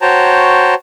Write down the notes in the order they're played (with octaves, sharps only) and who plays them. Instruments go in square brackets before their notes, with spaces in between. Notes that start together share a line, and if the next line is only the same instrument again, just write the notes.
[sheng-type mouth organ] F#4 C5 C#5 G5 A5 A#5